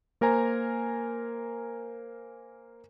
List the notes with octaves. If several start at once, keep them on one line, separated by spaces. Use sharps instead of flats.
A#3 A#4 C5 G#5 A#5